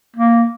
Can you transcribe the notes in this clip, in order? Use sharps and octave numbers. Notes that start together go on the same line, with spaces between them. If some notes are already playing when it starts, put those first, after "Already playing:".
A#3